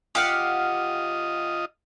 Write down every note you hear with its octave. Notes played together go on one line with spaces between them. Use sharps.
F4 G4 D#5 F5 F#5